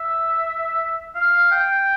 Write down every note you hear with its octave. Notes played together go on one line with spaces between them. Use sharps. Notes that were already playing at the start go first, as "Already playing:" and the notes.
Already playing: E5
F5
G5